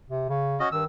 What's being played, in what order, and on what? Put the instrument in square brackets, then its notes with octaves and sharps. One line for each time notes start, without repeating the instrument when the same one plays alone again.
[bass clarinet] C3
C#3
[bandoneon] C#4 F#4 D#5
[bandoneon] G2 E6 [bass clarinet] D#3